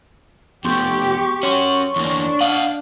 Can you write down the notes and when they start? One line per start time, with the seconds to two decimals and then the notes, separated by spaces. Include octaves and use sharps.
0.65 F2 A3 B3 G4 C6 C#6 G6
1.43 C#4 F#4 C#5 C6
1.96 E2 A#3 D4
2.41 D#5 F5 F#5